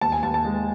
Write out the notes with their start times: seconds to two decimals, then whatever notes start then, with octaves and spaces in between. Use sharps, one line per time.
0.01 D#2 A5
0.12 G#5
0.23 D#2 A5
0.34 A5
0.45 G#3